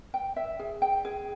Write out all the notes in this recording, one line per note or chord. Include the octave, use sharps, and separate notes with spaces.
G5
E5
G#4
G5
G#4